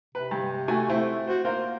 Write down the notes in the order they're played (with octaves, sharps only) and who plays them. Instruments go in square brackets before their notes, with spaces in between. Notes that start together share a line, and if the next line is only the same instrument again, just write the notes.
[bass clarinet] C3 [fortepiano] B4
[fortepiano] G2
A3 F#4 G#5
A3 C4 E4
[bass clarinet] F#4 [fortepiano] C5
[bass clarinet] A#3 [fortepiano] F4 A#4 C5